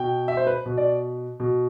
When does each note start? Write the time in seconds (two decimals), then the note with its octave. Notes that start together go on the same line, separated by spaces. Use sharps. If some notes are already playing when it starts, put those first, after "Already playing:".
Already playing: B2 G5
0.28 E5
0.37 C5
0.47 B4
0.66 B2
0.78 D5
1.40 B2